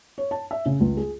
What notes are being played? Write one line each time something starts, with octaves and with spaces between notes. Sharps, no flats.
C#5
A5
E5
C#3
C#2
G#4